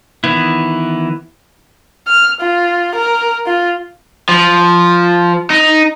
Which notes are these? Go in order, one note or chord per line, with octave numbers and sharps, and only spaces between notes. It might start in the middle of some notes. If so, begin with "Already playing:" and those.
D#3 E3 B3 E4
F6
F4
A#4
F4
F3
D#4